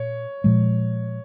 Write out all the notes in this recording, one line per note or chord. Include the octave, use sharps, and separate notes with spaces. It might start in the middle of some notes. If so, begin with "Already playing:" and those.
Already playing: A#2 C#5
A#2 F3 G#3